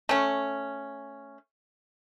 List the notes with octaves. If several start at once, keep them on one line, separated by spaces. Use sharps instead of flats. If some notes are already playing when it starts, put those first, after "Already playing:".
A3 C#4